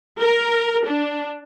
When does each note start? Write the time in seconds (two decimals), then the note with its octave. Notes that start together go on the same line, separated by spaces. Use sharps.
0.21 A#4
0.86 D4